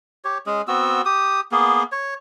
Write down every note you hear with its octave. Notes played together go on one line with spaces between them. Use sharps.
G4 C#5
G#3 C#4 G#4
B3 C4 F#4 E6
G4 D#6
A#3 B3 G#4
C#5